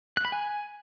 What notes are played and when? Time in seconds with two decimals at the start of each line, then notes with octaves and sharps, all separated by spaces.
0.17 F#6
0.25 B5
0.32 G#5